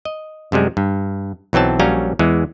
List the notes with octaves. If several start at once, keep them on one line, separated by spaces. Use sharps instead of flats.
D#5
F#2 C3 G3 G#3
G2
B1 E3 F#3 C4 A5
A#1 F#3 G3 C#4 F5 A#5
E2 E3 G#3